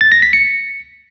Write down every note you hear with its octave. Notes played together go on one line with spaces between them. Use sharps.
A6
A#6
B6
C#7